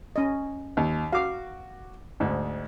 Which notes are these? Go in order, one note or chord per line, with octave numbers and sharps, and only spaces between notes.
C#4 D#5
D#2
F#4 F5 D6
D2 G#2